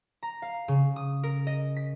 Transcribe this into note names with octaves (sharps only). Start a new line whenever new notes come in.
A#5
F5
C#3
D#6
A#4
D#5
B6